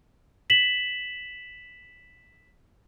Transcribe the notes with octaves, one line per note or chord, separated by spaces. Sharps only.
B6 E7 F#7